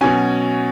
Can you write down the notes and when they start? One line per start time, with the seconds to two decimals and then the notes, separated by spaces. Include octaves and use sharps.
0.01 B2 F#3 C#4 G#5